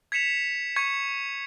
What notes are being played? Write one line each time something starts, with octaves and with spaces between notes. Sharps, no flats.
G#6 B6 C#7 E7 F7
C#6 G#6 C#7